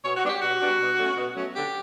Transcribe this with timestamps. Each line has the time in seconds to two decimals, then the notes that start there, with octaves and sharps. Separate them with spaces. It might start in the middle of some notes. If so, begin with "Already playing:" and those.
0.04 B2 C#5
0.17 F#4
0.23 G3 B3 D4
0.29 G4
0.41 B2 F#4
0.60 G3 B3 D4
0.80 B2
0.98 F#3 A3 C#4
1.16 B2
1.35 F#3 A3 C#4
1.55 D3 G4